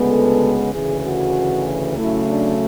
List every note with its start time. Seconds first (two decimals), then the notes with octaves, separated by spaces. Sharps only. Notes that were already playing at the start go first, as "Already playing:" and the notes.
Already playing: D2 C#3 G#3 B3
0.11 A4
0.73 D2 C#3 E3 G#4
1.04 F#4
1.97 C#3 F#3 A3 E4
2.28 D4